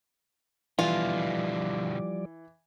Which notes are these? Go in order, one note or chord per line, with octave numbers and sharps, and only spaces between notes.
B2 D3 E3 F3 G3 F4 D5